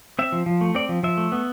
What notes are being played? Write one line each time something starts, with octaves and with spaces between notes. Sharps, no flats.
C4 E5
F3
F3
A3
C4 D5
F3
F3 E5
A3
B3